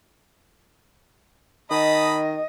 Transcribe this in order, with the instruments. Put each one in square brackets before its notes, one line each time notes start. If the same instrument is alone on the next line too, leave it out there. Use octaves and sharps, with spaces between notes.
[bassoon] D#3 [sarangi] D#5 [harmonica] A5 B5 D#6